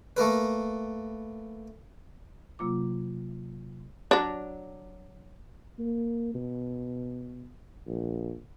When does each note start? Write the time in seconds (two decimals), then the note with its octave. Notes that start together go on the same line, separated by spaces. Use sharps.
0.17 A3 A#3 A#4 B4
2.59 C3 F#3 A#3 F4 D6
4.11 F#3 D4
5.79 A#3
6.35 B2
7.87 A#1